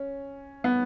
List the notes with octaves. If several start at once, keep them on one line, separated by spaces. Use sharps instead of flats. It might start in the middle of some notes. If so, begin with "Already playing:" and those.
Already playing: C#4
B3